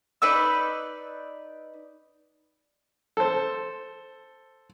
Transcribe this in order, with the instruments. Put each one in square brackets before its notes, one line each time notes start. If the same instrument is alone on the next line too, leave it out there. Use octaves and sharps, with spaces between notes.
[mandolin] D#4 B4 D5 E6
[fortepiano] A4 C5